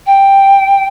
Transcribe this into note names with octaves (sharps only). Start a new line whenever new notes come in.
G5